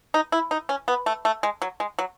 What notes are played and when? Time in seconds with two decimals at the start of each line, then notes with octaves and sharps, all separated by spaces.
0.14 D#4
0.32 E4
0.51 D#4
0.69 C#4
0.88 B3
1.06 A3
1.25 A3
1.43 G#3
1.62 F#3
1.80 G#3
1.99 F#3